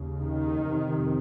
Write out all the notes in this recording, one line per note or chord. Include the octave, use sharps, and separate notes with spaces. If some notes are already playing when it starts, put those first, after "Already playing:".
Already playing: D#2 C#3
D#3
F2 C3